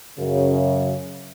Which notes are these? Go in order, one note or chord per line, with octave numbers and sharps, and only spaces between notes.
F#2 C#3